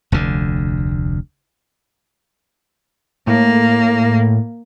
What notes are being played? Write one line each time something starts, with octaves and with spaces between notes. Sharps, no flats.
F1 D2 D3
A2 A#3